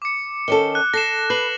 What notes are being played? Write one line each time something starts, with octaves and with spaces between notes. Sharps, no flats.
D6 C#7
D#3 C#4 A4 G7
F#6
A4 A#6 C7 E7
B4 F#6 C7 F#7